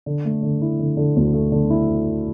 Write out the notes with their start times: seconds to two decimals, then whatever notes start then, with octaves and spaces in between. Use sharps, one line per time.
0.06 D3
0.25 A3
0.43 D3
0.62 E4
0.79 D3
0.97 D3
1.17 D2
1.34 A3
1.52 D3
1.70 E4